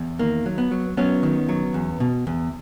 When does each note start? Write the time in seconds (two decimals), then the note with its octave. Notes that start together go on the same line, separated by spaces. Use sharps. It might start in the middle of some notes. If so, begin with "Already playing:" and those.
Already playing: E2
0.19 D#3 A#3
0.46 F#3
0.58 B3
0.71 F#3
0.97 F#3 B3 C#4
1.23 D#3
1.49 F#3
1.74 E2
2.00 B2
2.27 E2